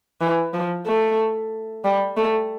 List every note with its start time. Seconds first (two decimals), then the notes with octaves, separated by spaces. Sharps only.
0.21 E3
0.54 F3
0.86 A3
1.85 G3
2.17 A3